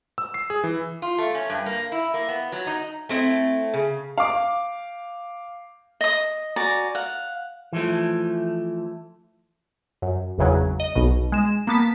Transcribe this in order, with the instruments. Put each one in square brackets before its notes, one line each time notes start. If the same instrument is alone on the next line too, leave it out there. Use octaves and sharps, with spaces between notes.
[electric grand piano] E6
C7
G#4
E3
[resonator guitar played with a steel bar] F4
A3
C#4
G2
A#3
E4
A#3
B3
F#3
D#4
[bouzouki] A3 C4 E4
C#3
[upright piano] F5 D6
[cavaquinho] D#5 D#6
F#4 D5 G#5 A#5
F5 F#5
[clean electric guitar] E3 F3 A3
[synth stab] F#2
G#1 E2 C#3 F#3
D#5
B1 B2
G#3 E7
A#3 B3 A5 B6